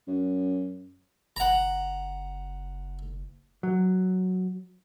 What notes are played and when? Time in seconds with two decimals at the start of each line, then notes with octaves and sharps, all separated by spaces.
0.07 F#2
1.36 F#1 F#5 A#5
3.63 F#3